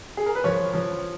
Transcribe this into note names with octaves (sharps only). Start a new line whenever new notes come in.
G#4
A#4
B4
F3 C#5
F3